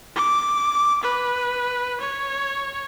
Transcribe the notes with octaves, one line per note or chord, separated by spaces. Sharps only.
D6
B4
C#5